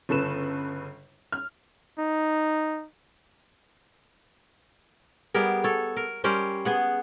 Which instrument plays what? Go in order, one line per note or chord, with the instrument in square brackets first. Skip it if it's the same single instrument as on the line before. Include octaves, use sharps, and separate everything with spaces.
[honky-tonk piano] G1 C#3 A4 B4 E7
F6
[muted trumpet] D#4
[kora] G3 B3 G#4 A#4
A4 C#5
A#4
G3 C#4 A#4 C5
B3 G#4 F#5